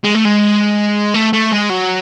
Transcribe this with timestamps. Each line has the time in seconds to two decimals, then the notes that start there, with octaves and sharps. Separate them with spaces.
0.04 G#3
0.15 A3
0.25 G#3
1.14 A3
1.33 A3
1.52 G#3
1.70 F#3